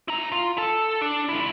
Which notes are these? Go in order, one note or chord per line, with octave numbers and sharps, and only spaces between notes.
E4 A#5
F4
A4
D4
C#2 E4